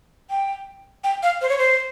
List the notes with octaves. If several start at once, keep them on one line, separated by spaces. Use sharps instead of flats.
G5
G5
F5
C5
C#5
C5